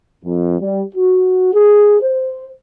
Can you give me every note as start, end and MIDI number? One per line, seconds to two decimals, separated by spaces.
0.24 0.56 41
0.60 0.82 55
0.96 1.50 66
1.54 1.98 68
2.01 2.49 72